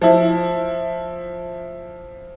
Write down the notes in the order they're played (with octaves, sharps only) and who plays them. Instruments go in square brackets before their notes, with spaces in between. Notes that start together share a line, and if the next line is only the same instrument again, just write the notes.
[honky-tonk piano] F3 E4